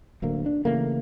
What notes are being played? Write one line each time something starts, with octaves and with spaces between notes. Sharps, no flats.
D1 D2 A#3
D4
C#3 E3 A3 A#3